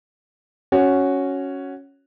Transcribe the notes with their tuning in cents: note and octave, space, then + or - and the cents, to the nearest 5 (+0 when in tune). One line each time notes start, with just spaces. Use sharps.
C#4 +0 F#4 +0